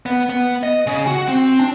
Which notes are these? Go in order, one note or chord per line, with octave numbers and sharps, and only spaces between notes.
B3
B3
D#5
C#3
F#4
C4
D4